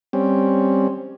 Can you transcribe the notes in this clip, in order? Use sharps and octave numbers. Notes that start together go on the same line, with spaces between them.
G3 C4 C#4